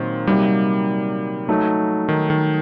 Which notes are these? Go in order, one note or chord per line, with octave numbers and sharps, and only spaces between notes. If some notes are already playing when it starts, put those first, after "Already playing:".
Already playing: A#2 D#3 F#3 C4 A#4
C3 F#3 G3 A#3 D#4 G4
F#3 A3 D#4
D#3
D#3